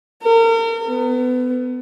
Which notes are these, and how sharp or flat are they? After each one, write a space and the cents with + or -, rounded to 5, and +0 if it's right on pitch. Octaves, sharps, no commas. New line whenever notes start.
A#4 -35
B3 +30